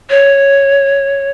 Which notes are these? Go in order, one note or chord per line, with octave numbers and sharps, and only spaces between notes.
C#5